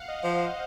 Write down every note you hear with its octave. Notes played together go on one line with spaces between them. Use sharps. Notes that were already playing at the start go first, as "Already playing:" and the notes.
Already playing: F5 F#5
D#5
F3
C5